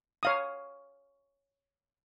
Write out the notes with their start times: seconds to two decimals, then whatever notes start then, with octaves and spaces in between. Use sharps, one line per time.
0.23 C#5 F5 D#6